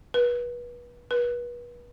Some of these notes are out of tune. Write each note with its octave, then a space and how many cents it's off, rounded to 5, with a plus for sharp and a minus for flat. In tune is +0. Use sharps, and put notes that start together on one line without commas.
B4 -30
B4 -35